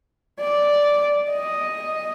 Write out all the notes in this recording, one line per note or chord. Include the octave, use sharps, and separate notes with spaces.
D5
D#5